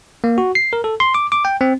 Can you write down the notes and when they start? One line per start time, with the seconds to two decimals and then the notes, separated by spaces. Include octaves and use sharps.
0.24 A#3
0.38 F#4
0.55 C7
0.73 A#4
0.84 A4
1.00 C6
1.14 D6
1.32 D6
1.45 G5
1.61 C4